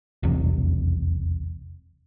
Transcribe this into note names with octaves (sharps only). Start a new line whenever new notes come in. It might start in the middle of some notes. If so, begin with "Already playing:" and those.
F1 B1 E2 C3